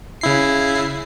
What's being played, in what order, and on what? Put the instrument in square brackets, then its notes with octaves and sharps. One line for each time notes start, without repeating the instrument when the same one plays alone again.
[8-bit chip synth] C#3 E4 C7